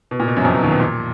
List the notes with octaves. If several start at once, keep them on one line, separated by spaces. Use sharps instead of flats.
B2
A#2
B2
F#2 F#3
F2 F3
B2
D#2 D#3
B2
A#2